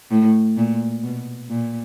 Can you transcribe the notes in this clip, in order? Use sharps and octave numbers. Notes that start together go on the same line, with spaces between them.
A2
A#2
B2
A#2